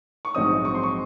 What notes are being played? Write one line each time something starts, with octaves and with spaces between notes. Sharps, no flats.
C#6
A#1 G#2 F#3 C4 D#4 D#6
C#6
C6
C#6